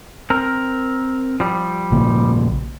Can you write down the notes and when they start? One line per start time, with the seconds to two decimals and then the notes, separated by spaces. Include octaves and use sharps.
0.30 C4 A#4
1.40 F3 G3
1.92 A#1 C#3 A#3